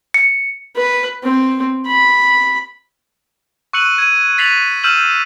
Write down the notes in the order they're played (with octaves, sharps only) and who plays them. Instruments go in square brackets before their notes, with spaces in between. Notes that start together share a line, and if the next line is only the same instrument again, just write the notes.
[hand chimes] C#7
[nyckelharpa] B4
C4
B5
[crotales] C#6 E6 F#6 C#7 D#7 F#7
G#6 D#7
A6 B6 C7 D#7 F7 F#7
E6 F6 G6 D#7 E7 F#7